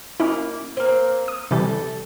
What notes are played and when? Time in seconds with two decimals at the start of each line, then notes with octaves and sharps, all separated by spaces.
0.20 A#3 C#4 D#4 E4
0.77 A#3 C4
1.28 D#6
1.51 C3 E3 G3 A4